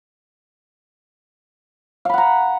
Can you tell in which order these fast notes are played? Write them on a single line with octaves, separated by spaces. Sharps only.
F5 B5 F#5 A#5